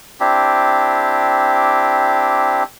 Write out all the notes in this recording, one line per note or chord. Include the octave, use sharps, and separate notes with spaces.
C4 D4 E4 G4